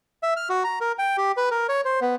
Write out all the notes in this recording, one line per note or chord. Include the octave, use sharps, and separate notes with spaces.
E5
F6
F#4
A#5
A#4
G5
G4
B4
A#4
C#5
C5
B3